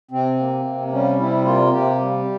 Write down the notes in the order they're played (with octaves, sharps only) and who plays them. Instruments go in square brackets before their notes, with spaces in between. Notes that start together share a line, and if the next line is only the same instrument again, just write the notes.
[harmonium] C3 C4
A#3
C3
G3 C#4
C3 E4
A#3 F4
C3 G4
G3